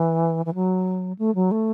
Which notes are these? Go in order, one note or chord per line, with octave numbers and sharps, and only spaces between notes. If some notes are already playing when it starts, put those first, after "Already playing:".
Already playing: E3
E3
F#3
A3
F#3
A3